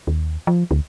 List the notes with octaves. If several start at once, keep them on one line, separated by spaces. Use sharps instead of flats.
D#2
F3
D2